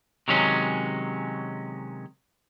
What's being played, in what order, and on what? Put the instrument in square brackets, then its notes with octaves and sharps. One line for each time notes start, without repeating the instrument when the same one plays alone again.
[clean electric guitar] C3 D#3 F#3 G#3 C#4